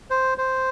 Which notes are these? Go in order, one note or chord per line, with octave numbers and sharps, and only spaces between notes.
C5
C5